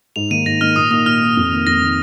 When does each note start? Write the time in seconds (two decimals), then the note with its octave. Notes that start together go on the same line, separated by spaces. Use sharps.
0.16 G#2 F7
0.31 D#3 A#3 D#4 D#7
0.46 G#2 A#6
0.61 D#3 A#3 D#4 F6
0.76 A#2 D#6
0.91 A#3 D#4 D#6
1.06 A#2 F6
1.21 A#3
1.26 D#4
1.37 F2
1.51 D#3 A#3
1.66 F2 A#6
1.81 D#3 A#3